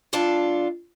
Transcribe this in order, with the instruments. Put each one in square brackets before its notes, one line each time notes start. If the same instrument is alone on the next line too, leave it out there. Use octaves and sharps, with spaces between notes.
[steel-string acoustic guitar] G2 D4 F4 A4 A5